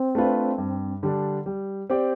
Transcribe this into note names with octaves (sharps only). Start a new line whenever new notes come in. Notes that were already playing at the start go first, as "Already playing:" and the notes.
Already playing: C4
A3 D4 F4 B4
G2
D3 G3 D4
G3
C4 G4 D5